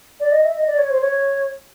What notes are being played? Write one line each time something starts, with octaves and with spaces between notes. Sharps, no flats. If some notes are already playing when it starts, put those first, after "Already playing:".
D5
D#5
E5
D#5
D5
C#5
C5
C#5